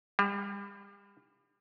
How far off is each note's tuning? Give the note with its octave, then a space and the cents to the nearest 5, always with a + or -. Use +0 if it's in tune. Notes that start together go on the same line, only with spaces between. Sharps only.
G3 +35